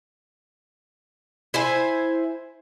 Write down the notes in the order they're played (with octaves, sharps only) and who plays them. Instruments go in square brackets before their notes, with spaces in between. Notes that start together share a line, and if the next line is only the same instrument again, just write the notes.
[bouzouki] E4 C5 G#5